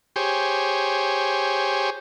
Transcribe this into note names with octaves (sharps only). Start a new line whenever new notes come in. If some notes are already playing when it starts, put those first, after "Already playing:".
G4 G#4 C5 C#5